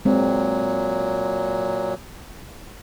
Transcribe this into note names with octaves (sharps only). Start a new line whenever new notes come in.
A#2 F#3 G#3 C4